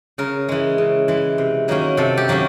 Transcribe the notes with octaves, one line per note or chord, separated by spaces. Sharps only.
C#3 A#4
E3 G#3
C#3
E3 G#3
C3
D#3 F#3 A#3 C#4
C3 A4
G4
D#3 F#3 A#3 C#4